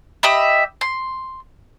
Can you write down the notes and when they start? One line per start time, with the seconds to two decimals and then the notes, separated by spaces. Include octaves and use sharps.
0.23 G4 D#5 E5 B5
0.81 C6